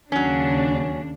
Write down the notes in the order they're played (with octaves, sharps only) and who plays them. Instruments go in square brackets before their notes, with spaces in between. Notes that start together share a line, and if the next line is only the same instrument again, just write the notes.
[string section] D#2 C#3 D4 [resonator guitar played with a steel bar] F#3 C#4